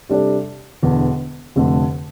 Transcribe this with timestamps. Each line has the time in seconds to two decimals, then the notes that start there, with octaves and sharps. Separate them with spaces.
0.09 C3 G3 D4 A4 D5
0.83 E1 E2 D3
1.56 F1 F2 D3 A3